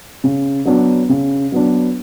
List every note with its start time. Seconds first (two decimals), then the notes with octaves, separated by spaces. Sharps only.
0.24 C#3
0.66 F#3 B3 D4
1.09 C#3
1.52 F#3 B3 D4